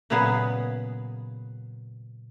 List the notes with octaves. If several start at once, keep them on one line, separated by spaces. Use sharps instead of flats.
A#2 C#3 F#3 B3 G#4